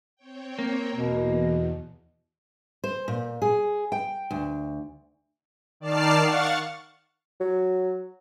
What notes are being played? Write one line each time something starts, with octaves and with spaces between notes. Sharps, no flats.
C4 C#5 G5
A#3
E2 B2
C5
A#2
G#4
G5
D2
D#3 D5 A5 F6 C7
F5 F#5 C#6 A6
F#3